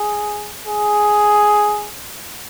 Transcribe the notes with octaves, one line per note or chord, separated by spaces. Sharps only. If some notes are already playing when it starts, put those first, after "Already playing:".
Already playing: G#4
G#4